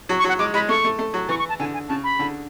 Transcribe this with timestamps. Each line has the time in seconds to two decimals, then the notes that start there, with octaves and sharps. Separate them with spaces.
0.09 F#3
0.19 C#6
0.24 F#3 F#5
0.39 G#3 D6
0.54 G#3 B5
0.69 A3 C#6
0.85 A3
0.99 A3
1.14 F#3
1.29 E3 C#6
1.39 C#6
1.49 A5
1.60 D3 G#5
1.74 G#5
1.89 C#3 A5
2.04 B5
2.19 D3